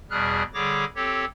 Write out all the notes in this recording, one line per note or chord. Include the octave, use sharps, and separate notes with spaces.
E2 B2 G3 G#4 F6 F#6
D3 G3 G#4 C#5 D6 A#6
C4 G4 A4 C#5